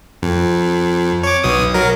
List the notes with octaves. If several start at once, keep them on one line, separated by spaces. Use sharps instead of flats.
F2
C#5 D6
B1 B2 D#6
F#3 A#4